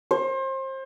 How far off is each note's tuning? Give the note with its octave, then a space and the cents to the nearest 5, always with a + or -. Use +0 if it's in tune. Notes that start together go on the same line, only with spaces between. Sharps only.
C5 +30